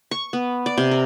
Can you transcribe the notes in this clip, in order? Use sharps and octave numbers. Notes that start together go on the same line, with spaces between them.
C#6
B3
D5
C3
A#4